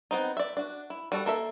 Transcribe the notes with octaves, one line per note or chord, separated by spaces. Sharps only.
B3 C4 D#4
D5 E5
D4 F#4
E4
G3 F#4 A4
A#3 A4 E5